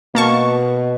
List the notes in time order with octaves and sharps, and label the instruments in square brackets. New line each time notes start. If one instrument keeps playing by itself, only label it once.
[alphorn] B2 [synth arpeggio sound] A#3 A5 C#6